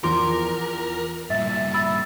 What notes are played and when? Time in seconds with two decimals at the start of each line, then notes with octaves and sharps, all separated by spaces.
0.04 E2 F3 A#4 C6 D6
1.30 G2 A#2 E5 A6
1.74 B5 E6